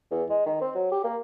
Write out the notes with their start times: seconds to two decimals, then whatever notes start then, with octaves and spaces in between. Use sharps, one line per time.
0.11 E2
0.30 G#3
0.46 D#3
0.61 C4
0.75 F#3
0.92 G4
1.04 A#3